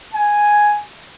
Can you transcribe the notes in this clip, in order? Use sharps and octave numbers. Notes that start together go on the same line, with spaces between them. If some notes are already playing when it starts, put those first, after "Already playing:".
G#5